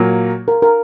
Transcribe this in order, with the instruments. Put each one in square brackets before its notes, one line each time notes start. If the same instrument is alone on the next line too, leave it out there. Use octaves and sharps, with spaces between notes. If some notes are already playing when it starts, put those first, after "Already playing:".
Already playing: [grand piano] A#2 F#3 A#3
[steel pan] A#4
A#4